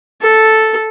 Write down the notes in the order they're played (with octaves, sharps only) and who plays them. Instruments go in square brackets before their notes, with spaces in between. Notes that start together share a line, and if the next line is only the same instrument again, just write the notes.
[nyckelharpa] A4